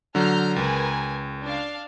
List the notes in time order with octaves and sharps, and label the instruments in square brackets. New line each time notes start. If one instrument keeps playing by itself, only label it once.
[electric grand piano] D3 F#3 [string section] A#5 F6 G6
[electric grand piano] C#2 [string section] A#4 B4 G#5
[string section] D4 F5